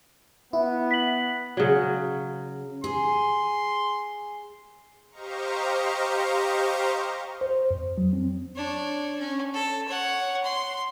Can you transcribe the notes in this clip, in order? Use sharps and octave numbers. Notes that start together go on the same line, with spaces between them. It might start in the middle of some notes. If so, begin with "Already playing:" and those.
B3 E4
B6 F#7
C#3 F#3
G#4 C6
G4 C5 D#5 F5 A#5 C#6
C5
F2
F#3
C4
D4 C#5
C#4
A4
C#5 F#5
C6